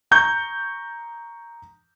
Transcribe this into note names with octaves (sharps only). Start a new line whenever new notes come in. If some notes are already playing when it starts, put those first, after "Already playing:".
A#5 C#6 G6